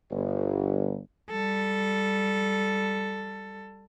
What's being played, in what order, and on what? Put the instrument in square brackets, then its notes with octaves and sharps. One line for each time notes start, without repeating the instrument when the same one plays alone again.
[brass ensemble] G1
[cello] G3 A4